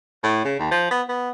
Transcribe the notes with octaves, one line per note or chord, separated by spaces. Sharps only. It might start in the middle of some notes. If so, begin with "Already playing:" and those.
A2
C#3
D#2
F3
B3
B3